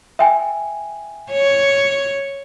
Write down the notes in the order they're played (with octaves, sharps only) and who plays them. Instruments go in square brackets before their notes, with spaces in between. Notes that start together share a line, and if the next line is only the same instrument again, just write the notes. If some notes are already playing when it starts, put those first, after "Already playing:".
[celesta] E5 G5 G#5
[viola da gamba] C#5